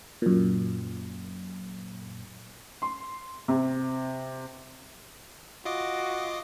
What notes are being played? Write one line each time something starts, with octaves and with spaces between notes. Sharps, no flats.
F#2 A#2
C6
C3
F4 F#4 D#5 D6